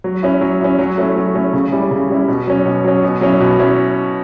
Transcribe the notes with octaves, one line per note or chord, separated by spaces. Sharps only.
F#3
C#4 E4
F#3
C#4 E4
F#3
A3 C#4 E4
F#3
A3 C#4 E4
C#3
G3 C#4 E4
C#3
G3 C#4 E4
B2
F#3 C#4
B2
F#3 C#4
B2
F#3 C#4 E4
B2
F#3 C#4 E4